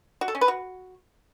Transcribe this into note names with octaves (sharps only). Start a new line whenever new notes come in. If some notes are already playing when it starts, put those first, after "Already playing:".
F#4
A4
C#4
B4
F#4